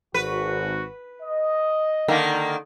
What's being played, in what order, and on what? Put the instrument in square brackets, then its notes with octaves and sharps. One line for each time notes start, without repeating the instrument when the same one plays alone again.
[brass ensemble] G#1 F#4 [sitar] B4
[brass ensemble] D#5
[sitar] D3 D#3 A#3